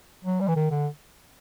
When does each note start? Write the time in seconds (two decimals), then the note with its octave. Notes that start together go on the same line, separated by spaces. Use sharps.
0.25 F#3
0.41 G3
0.48 E3
0.56 D#3
0.71 D3